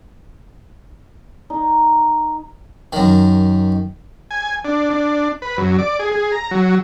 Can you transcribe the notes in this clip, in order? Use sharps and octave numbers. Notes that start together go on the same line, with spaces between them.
D#4
F#2 D#3
G#5
D4
D4
B4
F#2
D5
G#4
G#4
A#5
F#3